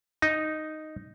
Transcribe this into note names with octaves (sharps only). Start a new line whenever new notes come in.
D#4